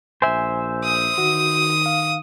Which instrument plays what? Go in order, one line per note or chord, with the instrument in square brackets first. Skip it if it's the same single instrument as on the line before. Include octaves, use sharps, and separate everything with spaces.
[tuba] A#1 [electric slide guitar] C5 E5 [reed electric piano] G#5
[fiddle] D#6
[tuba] D#3 [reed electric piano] F#4
[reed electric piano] F5